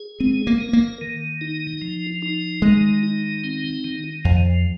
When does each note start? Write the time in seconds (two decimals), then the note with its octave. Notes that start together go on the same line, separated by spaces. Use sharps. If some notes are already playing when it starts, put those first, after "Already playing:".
Already playing: G#4
0.20 G#3 C4
0.47 A#3
0.61 A#4
0.73 A#3
1.01 D#3
1.41 D#4
1.82 F3
2.22 D#4
2.62 D#3 G#3
3.03 D#4
3.44 C4
3.84 D#3
4.25 F2 F3